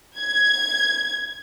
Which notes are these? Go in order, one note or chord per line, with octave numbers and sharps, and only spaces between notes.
G#6